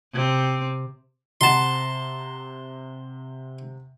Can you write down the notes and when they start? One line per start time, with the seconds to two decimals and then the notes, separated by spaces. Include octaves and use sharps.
0.13 C3 C4
1.41 C3 F#5 A5 A#5 C6